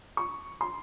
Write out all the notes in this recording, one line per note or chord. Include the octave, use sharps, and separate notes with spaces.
C#6
C6